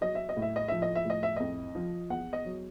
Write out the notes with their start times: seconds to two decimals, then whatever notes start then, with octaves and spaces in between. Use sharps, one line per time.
0.01 F#3 D#5
0.15 E5
0.29 D#5
0.36 A2
0.42 E5
0.56 D#5
0.68 F3 E5
0.82 D#5
0.95 E5
1.05 A2 D#5
1.23 E5
1.36 F2 D#5
1.75 F3
2.10 E2 F#5
2.33 D#5
2.45 F#3